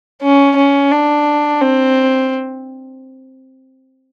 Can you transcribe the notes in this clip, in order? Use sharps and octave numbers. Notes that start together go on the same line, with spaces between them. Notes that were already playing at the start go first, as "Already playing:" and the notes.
C#4
C#4
D4
C4